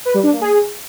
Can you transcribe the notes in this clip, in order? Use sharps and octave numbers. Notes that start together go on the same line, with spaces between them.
B4
G3
D4
A#3
G#4